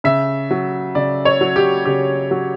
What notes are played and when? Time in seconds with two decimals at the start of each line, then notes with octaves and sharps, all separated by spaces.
0.04 C#3 E5
0.51 F#3
0.95 C#3 D5
1.25 C#5
1.41 F#3
1.56 G4
1.85 C#3 G4
2.31 F#3